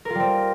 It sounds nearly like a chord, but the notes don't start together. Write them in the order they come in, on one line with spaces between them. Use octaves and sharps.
A#4 F4 G3 C4